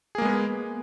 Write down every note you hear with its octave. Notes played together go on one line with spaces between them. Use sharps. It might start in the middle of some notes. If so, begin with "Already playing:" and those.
G#3 A#3 B3 G#4